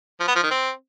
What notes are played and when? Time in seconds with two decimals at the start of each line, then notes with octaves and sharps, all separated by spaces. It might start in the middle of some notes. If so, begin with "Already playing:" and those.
0.20 F3
0.28 B3
0.36 F3
0.43 D#3
0.51 C4